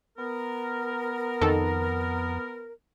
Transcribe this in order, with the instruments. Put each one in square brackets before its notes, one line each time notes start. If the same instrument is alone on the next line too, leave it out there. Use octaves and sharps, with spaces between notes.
[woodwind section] B3 A#4
[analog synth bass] F2 [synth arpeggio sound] D#3 A4